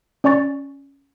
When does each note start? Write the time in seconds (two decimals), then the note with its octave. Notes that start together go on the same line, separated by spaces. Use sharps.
0.24 C#4 D5 G#5 C#6 A6